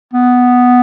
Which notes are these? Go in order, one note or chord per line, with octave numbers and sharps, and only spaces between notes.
B3